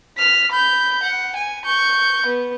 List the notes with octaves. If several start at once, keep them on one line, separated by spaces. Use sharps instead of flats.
F6 B6
B5 G6
F#5
G#5
C#6 G6
B3